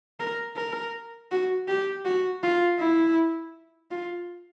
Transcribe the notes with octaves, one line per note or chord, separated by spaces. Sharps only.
A#4
A#4
F#4
G4
F#4
F4
E4
F4